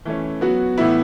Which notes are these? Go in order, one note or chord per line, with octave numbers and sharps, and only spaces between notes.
E3 A3 C#4
F#3 B3 F#4
A2 E3 B3 E4